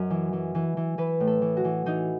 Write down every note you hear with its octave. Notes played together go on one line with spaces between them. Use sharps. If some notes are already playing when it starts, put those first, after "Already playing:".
Already playing: F#2 D#5
E3
E3
E3
E3
E3 B4
A2
A4
E3
F#4
E3
E3 D#4